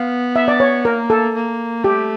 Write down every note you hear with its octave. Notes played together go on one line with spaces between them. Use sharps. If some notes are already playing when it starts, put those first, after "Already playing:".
Already playing: B3 F5
E5
D5
C#5
A#3 A#4
A4
A#3
A3 G4